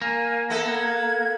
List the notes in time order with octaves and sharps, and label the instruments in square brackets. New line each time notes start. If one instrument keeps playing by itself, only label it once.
[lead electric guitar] A#3 [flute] G#5
[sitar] B3 A4 [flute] E5
[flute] G#6